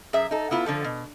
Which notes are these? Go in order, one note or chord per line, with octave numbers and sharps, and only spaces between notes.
F#2 G#4 E5
D#4 A4
B3 E4 F4
D3 F3 A4
B2